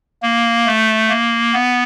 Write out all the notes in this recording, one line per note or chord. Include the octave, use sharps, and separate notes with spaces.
A#3
A3
A#3
B3